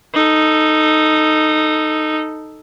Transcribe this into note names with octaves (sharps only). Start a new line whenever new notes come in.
D#4 A4